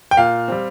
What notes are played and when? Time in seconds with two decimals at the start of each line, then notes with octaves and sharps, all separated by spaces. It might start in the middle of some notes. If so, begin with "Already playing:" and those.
0.11 G5
0.17 A#2 F5
0.48 G3 C4